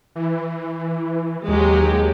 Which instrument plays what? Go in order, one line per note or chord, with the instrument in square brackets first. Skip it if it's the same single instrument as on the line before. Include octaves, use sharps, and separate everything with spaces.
[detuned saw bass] E3
[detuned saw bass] D#2 [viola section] F#3 G#3 G4